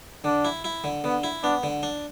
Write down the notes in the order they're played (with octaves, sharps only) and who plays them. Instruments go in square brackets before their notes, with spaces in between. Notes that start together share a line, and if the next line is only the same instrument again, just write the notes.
[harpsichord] D3 [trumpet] D4
[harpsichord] E4
E4
D3
[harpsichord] D3 [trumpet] B3
[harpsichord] E4
[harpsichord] B3 [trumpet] D4
[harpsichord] D3
D4